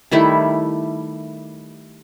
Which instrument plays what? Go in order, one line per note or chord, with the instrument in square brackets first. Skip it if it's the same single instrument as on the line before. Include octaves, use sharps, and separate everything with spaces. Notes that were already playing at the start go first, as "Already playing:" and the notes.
[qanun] D#3 G3 A3 E4